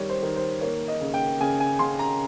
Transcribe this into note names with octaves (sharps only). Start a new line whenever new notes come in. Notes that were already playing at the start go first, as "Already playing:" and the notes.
Already playing: D#3 G3 C#5
C5
D#3
C5
A#3 C#5
D#5
C#3
G5
C#3 G#5
G#5
C#3 C6
A#5